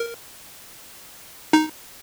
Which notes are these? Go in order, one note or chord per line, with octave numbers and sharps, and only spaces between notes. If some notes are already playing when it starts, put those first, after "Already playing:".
Already playing: A#4
D#4